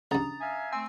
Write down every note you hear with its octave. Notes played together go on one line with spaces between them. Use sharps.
C#2 G2 A#5 D#6 A6
E5 F5 G#5
A3 C4 G#5 E6